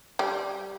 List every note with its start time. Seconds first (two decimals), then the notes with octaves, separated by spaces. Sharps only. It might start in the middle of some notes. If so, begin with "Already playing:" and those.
0.19 G3